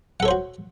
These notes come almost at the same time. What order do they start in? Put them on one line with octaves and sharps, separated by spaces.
F#5 A4 C#5 C5 F#4